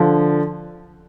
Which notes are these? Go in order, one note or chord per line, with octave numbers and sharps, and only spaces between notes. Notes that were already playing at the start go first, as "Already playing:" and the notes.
Already playing: D3 F3